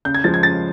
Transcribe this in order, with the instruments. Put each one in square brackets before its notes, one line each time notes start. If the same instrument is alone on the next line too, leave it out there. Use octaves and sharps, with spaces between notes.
[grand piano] C#3 G6
G#6
F3 G#3 A6
G#6
C#3 A6